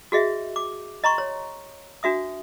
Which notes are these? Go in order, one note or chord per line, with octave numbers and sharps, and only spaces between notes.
F#4 G#4 D#5 E5
D6
D#5 A#5 C6 C#6
C#5
D4 F#4 E5 D#6